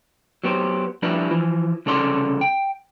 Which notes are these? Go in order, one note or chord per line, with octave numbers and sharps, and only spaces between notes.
F#3 B3 G4 C5
F3 G3 D4 E4 B4
E3 F3
C2 C#3 A4 D5 C6
G5